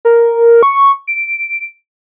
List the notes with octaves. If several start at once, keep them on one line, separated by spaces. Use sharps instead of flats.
A#4
C#6
D7